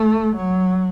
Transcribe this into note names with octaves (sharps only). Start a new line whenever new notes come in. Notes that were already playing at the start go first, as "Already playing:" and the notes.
Already playing: A3
F#3